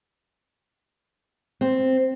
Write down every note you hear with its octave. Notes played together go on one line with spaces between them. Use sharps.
C4